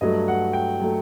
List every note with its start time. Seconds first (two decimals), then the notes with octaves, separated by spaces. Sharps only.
0.01 G2 F#3 A3 D#5
0.28 F#5
0.53 G5
0.81 F#3 A3